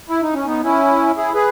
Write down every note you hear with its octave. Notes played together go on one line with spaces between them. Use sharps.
E4
D#4
C#4
B3 D#4
C#4 E4
E4 G#4
G#4 B4